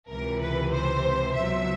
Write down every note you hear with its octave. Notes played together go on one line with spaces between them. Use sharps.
C#2 C3 E3 A#4
B4
C5
C#2 B2 F#3 E5